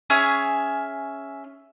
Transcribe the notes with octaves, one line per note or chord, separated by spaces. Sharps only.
C#4 G#4 E5